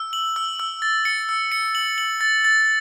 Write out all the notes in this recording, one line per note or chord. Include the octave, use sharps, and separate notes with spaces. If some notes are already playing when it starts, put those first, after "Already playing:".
Already playing: E6
F#7
E6
E6
A6
C#7
E6
C#7
F#7
F#7
A6
A6